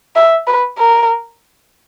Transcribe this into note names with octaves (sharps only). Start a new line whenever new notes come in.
E5
B4
A#4